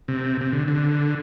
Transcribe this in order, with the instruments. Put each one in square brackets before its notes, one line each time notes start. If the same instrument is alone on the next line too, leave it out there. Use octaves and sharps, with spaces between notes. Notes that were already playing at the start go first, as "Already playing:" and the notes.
[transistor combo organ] C3
C3
D3
D3